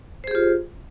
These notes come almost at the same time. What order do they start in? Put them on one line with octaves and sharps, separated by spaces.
C5 G#4 G4 F4